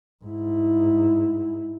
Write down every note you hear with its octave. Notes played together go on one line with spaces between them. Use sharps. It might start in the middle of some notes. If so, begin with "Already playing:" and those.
G#2 E4